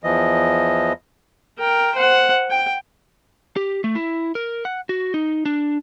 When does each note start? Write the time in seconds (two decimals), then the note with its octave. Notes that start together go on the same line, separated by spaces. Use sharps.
0.04 E2 E3 F3 D#5
1.58 A#4 G5
1.95 C5 F#5
2.50 G5
3.56 G4
3.84 A3
3.95 E4
4.35 A#4
4.65 F#5
4.89 F#4
5.14 D#4
5.45 D4